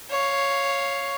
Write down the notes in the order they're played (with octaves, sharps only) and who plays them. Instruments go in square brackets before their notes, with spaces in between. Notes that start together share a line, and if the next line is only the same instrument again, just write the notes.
[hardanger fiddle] C#5 F5